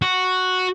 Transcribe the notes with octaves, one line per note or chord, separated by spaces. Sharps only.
F#4